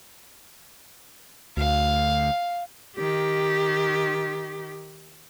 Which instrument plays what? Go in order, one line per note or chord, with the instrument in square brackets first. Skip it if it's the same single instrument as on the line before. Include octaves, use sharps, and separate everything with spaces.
[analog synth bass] D2 [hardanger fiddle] F5
[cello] D#3 G4